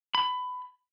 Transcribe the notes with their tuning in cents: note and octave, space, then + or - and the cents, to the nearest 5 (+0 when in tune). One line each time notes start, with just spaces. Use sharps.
B5 +20